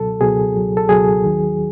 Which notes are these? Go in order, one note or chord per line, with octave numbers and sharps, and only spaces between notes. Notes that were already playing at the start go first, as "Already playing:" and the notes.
Already playing: C#2 B2 F#3 A4
C#2 B2 F#3 G#4
C#2 B2 F#3
A4
C#2 B2 F#3 G#4
D#2 D#3 F#3